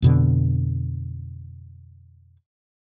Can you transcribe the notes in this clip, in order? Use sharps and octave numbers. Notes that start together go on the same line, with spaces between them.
F2 B2 D3